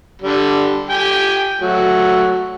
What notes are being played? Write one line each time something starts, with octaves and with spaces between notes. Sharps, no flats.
D3 G3
G4 G5 G#5
F#3 A3 F#4